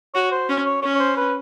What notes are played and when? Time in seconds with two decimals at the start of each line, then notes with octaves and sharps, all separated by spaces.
0.14 F#4 C#5
0.31 C5
0.49 C#4
0.65 C#5
0.82 C#4 C#5
0.95 C#5
1.00 C5
1.17 B4